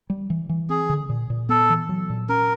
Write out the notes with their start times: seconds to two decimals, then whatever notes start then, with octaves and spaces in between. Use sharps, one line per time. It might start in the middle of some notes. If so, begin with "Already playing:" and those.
0.10 G3
0.30 E3
0.49 E3
0.69 C4 G#4
0.90 D3
1.09 A#2
1.30 A#2
1.49 B3 A4
1.70 E3
1.89 F#3
2.10 A#2
2.29 C#4 A#4